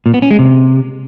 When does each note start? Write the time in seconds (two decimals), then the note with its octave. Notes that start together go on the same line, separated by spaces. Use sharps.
0.06 A#2
0.14 B3
0.22 C#4
0.31 G#3
0.39 C3